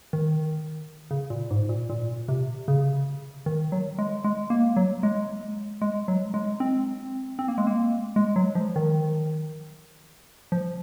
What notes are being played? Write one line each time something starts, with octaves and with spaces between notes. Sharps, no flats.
D#3
C#3
A#2
G#2
A#2
A#2
C3
C#3
D#3
F#3
G#3
G#3
A#3
F#3
G#3
G#3
F#3
G#3
C4
C4
A#3
G#3
A#3
G#3
F#3
F3
D#3
F3